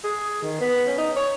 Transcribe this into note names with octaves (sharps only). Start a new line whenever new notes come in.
G#4
D#3
B3
C#4
D#4
C#5